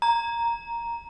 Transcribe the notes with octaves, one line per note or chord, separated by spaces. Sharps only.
A#5